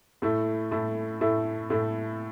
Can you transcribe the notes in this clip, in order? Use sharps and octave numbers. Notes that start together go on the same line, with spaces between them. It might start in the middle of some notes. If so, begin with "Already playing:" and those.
A2 A3 E4
A2 A3 E4
A2 A3 E4
A2 A3 E4